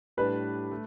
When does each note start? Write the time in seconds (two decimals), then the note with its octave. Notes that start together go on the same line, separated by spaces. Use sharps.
0.17 A2 G3 D4 G4 B4
0.71 A3